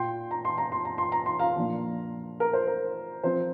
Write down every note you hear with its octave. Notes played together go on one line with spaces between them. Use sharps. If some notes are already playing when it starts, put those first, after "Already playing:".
Already playing: A#2 A#3 F4 G5 C6
A#5
C6
A#5
C6
A#5
C6
A#5
C6
F5 A#5
A#2 F3 A#3 D4
A#4
C5
A#4
F3 C4 F4 C5